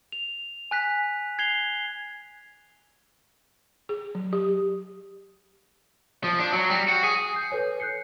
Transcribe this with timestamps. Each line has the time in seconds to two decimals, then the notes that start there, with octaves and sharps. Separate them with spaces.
0.12 F7
0.71 G#5 F#6 B6
1.39 G#6 C7 F7 G7
3.89 G#4
4.15 F#3
4.33 G4
6.24 F3
6.39 D4
6.52 F#3
6.70 G3
6.88 F#4
7.04 G#4
7.34 G6 C7
7.51 A4 B4 C#5 G#5
7.80 F#6 G6 C7 C#7